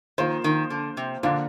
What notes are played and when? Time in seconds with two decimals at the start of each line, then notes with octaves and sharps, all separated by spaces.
0.18 D#3 F3 A#3 F4 C5
0.44 D#3
0.70 D3
0.97 C3
1.23 A#2 D3 F3 A#3 D4 F4